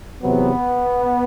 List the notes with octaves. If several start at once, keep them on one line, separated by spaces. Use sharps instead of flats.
E2 C3 F#3 B3